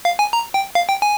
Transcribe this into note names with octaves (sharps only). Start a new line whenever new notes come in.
F5
G#5
A#5
G5
F5
G5
G#5